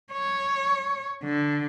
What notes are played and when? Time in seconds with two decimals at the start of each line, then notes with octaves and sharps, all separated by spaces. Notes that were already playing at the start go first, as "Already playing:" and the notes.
0.13 C#5
1.24 D3